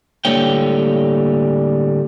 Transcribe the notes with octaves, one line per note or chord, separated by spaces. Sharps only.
A2 D3 G3 A#3 C#5 G5